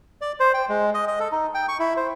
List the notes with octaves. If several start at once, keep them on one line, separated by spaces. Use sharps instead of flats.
D5
C5
G5
G#3
D#5
D#5
A4
D#4
G5
C#6
E4
C5